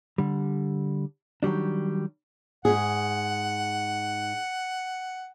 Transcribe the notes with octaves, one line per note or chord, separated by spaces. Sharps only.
D3 G3
D#3 F#3 G3 D4
G#2 G#4 F#5